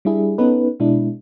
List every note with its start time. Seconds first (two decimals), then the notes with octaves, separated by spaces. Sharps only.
0.05 G3 D4 E4 G#4
0.38 B3 C#4 D#4 A4 B4
0.80 B2 G#3 D4 E4